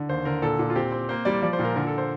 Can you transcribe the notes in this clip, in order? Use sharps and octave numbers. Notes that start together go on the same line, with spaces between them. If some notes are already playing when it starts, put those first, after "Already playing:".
Already playing: D3
D#2 C5
D3 A#4
A#2 A4
A#2
F4
C4 G4
C4
A#3 C5
G3 D5
F3 D5
C5
A#2
A#4
D3 A#4
A4
C5